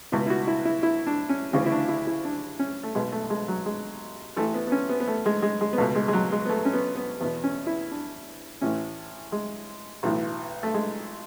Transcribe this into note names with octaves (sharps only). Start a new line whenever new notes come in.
C#2 B2 E4
E4
F#4
E4
E4
E4
D4
C#4
D2 C#3 E3 C#4
E4
D4
E4
E4
D4
C#4
A3
B1 B2 G#3
A3
G#3
F#3
G#3
A1 A2 E3 A3
B3
B3
C#4
B3
B3
A3
G#3
G#3
G#3
B3
C#2 B2 A3
G#3
G#3
F#3
G#3
B3
A3
C#4
B3
B3
E2 B2 B3
C#4
E4
D4
A1 A2 E3 C#4
G#3
B1 A2 E3
A3
G#3